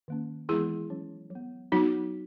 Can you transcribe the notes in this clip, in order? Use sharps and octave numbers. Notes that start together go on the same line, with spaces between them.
D#3 A#3 C#4
E3 G#3 B3 E4 G#4
F#3 C#4
F#3 B3
F#3 B3 D#4 F#4